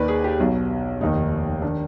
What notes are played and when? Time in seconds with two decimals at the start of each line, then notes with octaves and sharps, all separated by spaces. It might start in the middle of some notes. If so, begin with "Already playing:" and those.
Already playing: D#2 D#3 B4 D5
0.08 G#4
0.24 G4
0.39 B1 B2
1.01 F1 D#2 D#3 D#4
1.62 D#3 D4